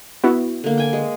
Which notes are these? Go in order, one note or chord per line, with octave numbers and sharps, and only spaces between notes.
B3 E4 F#4
D3 A#3
G5 G#5
G#3